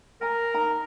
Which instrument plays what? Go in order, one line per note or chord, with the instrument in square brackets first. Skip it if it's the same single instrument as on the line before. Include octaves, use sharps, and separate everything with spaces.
[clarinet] A#4 [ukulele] G#5 A#5
[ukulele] D#4 A#5